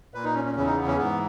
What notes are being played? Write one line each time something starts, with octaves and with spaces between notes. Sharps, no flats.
A#2 B4
D#4
C#4
C#4
E2 C#3 E3 C#4
D#4
B3
C#4
G#2 E3 B3